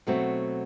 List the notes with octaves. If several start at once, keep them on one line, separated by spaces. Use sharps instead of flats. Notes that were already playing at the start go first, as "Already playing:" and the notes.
B2 F#3 A3 C4 F#4